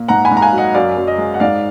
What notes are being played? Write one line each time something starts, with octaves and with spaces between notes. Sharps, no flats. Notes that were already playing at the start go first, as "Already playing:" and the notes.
Already playing: A#2
G#2 F#5 A#5
G#5 B5
G#2
A#5
F5 G#5
F#3
D#5 F#5
F#2 D5 F5
F#2
D#5
G#3
F#5
G#2 D5 F5